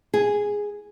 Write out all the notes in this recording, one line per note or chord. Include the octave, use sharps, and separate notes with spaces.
G#4